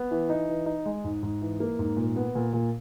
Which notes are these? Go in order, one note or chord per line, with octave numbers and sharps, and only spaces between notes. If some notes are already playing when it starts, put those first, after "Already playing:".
Already playing: B3
E3
D#4
E3
D#4
G#3
G#2
G#2
E3
A#3
G#2
A#2
B3
A#2
A#2